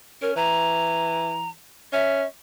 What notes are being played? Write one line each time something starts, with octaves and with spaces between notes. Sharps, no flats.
C#4 A#4
E3 A#5
C#4 E5